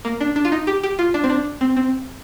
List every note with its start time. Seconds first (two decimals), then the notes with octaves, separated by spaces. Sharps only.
0.05 A#3
0.21 D4
0.36 D4
0.45 F4
0.52 D#4
0.67 G4
0.83 G4
0.99 F4
1.14 D4
1.24 C4
1.30 D4
1.61 C4
1.76 C4